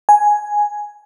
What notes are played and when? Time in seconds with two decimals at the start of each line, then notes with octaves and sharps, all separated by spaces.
0.09 G#5